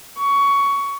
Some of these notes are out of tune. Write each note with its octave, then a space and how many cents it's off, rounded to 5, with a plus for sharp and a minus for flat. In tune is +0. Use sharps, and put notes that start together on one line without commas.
C#6 +15